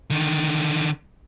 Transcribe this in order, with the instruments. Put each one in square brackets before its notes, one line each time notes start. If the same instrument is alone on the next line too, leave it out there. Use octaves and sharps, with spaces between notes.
[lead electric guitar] D3 D#3